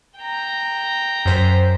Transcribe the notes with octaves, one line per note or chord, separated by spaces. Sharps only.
G5 A#5
F#2 C5 B6